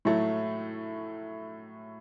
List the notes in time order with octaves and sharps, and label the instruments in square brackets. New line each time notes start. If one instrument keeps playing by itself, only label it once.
[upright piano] A2 F#3 A3